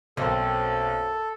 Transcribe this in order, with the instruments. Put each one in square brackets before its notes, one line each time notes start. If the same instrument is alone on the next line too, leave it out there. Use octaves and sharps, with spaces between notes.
[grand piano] B1 [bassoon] F#2 [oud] A#3 C4 [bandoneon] A4